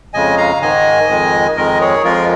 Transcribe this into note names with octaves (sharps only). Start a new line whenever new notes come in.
F2 C#3 G#3 D#5 G#5
F5 A#5
G#2 D#3 G#3 D#5 G#5
F2 D#3 G#3
F2 D#3 G#3 A#4 D#5
G#4 C#5
F2 F3 G#3 F4 A#4